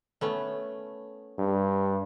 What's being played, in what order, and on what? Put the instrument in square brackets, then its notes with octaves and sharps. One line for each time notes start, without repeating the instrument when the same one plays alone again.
[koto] A3 B3 C#4
[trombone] G2